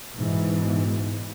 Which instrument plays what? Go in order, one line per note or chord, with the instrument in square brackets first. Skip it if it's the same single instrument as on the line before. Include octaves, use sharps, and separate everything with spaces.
[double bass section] G#2 B2 E3